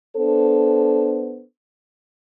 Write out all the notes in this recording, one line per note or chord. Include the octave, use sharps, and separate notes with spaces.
B3 D4 A4 C5